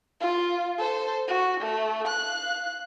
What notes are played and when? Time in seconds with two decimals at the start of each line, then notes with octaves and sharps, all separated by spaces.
0.20 F4
0.78 A4 C5
1.28 F#4
1.60 A3
2.04 F5 F#6